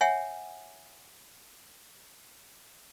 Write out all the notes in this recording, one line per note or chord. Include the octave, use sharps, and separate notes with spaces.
C#5 E5 F#5 G#5